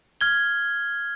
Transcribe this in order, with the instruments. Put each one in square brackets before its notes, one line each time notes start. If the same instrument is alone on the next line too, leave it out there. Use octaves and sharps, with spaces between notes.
[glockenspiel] F6 G#6 G7